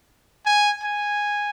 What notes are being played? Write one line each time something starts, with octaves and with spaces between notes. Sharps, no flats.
G#5
G#5